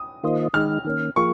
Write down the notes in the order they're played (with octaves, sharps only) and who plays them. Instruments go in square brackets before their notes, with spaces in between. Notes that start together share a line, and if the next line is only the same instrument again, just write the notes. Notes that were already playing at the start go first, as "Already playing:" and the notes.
Already playing: [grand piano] D#6
[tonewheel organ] D#3 A#3 F4 C5 D#5
[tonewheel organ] D#3 G#3 D#4 [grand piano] F6
[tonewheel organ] D#3 A#3 C#4
[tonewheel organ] F3 A#3 F4 G#4 [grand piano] C#6